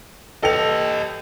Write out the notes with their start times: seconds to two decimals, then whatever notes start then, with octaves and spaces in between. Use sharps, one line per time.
0.43 G4 A4 B4 D#5 G5 F7